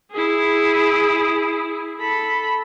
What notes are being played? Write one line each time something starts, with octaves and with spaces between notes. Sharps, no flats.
E4 G#4
A4 B5